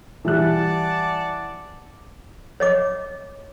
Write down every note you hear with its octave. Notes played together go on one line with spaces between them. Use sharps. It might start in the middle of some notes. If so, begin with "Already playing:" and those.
E3 G3 D5 F#5 A5 F#6
C#5 D#5 D6